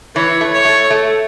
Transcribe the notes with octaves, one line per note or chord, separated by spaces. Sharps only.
E3 C#5
A3
C#5
A3
A3